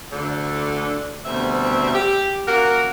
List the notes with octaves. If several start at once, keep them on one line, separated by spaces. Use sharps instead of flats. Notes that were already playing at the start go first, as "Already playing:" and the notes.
D2 D3
D2 B2 G3 C4 E5
G4
A#3 C#4 F#4 A#4